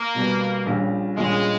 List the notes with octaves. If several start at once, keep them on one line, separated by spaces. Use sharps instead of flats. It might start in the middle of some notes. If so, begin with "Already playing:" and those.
Already playing: A#3
B2 G3 B3
A#1 A#2 G3 C#4
A#1 A#2 G3 G#3 C#4